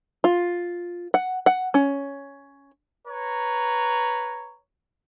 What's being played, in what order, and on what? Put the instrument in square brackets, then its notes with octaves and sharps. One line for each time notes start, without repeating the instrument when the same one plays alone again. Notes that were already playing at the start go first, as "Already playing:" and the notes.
[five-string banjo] F4
F#5
F#5
C#4
[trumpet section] B4 C#5 A#5